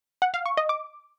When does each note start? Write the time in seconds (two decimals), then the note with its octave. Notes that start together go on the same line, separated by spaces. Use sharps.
0.22 F#5
0.34 F5
0.46 C#6
0.57 D#5
0.69 D6